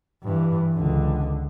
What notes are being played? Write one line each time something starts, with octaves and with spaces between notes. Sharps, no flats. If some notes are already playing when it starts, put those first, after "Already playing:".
G2 E3
C#2 D3